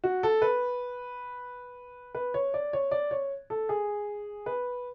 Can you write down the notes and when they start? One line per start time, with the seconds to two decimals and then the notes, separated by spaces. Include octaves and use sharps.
0.04 F#4
0.23 A4
0.42 B4
2.14 B4
2.34 C#5
2.54 D5
2.73 C#5
2.91 D5
3.11 C#5
3.50 A4
3.69 G#4
4.46 B4